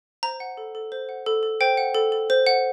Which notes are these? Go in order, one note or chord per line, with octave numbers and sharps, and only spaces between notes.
C5 A#5
F#5
A4
A4
C5
F#5
A4
A4
C5 G5
F#5
A4
A4
C5
F#5